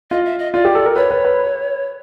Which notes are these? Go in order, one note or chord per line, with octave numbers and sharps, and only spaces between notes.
F4 D#5
E5
D#5
F4 D5
G4
A4
A#4
B4 C#5
B4
B4